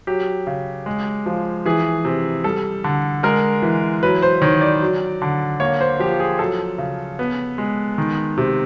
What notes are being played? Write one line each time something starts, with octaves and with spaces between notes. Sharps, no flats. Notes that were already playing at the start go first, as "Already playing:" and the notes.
F#3 G4
C#3
G#3
F3
E3 G#4
C3
G3 A4
D3
G#3 A#4
E3
F#3 B4
C5
D#3 C#5
D5
F#3
D3
A#3 C#5
C5
F3 G4
G#4
F#3 A4
C#3
B3
G#3
D#3
C3